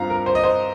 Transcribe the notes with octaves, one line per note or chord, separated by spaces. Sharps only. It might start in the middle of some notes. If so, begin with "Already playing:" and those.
Already playing: G2 F3 C4 F5 A#5
A#4
C5
D#5
C5